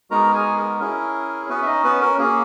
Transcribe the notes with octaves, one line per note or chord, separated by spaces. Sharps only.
G#3 B3 D#4 F#4 A#4 A#5
G#4 G#5
A#4
C#4 E4 G#4 A#4
B3 C#4 F#4 B4
E5
D#4 D#5
B3 B4
A#4
A#3 C#4 F#4 G#4